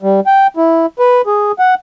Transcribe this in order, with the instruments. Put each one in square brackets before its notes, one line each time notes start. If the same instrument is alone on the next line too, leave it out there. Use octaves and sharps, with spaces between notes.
[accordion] G3
G5
E4
B4
G#4
F#5